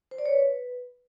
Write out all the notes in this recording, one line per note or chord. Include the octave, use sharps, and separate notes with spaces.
C5
D5
C#5
B4